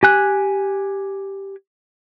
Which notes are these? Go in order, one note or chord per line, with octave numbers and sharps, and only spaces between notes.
G4 G#5 F#6